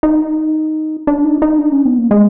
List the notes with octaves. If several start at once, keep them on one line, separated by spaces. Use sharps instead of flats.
D#4
D4
D#4
D#4
D4
C#4
B3
A#3
G#3